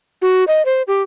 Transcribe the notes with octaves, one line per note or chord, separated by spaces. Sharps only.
F#4
D#5
C5
G4